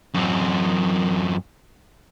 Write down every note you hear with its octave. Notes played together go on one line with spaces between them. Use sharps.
F#2 C4